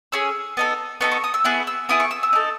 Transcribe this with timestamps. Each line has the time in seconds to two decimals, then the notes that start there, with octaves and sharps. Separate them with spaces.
0.12 C#4 G#4 E6
0.57 B3 D#4 A4
1.01 B3 D#4 A4 C#6
1.12 C#6
1.24 D#6
1.34 E6
1.45 B3 E4 G#4 F#6
1.67 E6
1.89 B3 E4 G#4 D#6
2.00 C#6
2.11 E6
2.23 E6
2.33 D#4 A4